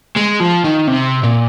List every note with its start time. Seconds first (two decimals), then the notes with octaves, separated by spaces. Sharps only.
0.16 G#3
0.40 F3
0.64 D#3
0.87 C3
1.24 A#2